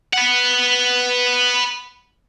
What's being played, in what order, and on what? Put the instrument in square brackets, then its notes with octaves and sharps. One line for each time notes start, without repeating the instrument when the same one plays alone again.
[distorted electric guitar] B4 F#5